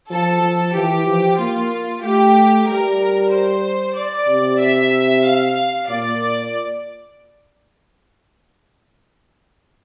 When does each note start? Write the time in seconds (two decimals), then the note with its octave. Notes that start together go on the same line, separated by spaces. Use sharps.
0.10 F3 A4
0.42 F3
0.74 E3 G4
1.06 F3
1.39 A#3 F4
2.03 A3 G4
2.67 G3 A#4
3.32 C5
3.96 D5
4.28 C3
4.60 E5
5.24 F5
5.88 A#2 D5